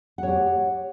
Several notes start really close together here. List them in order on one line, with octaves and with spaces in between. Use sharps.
F#5 C#5 G4